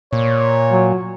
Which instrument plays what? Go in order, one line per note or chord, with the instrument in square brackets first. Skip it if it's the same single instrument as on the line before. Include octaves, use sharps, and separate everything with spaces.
[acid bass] A#2 [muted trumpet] C#5
[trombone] F#3